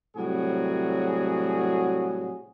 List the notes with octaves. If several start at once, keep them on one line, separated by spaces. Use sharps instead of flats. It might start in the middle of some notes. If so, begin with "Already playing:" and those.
A2 C3 F#3 G3 F#4 G#4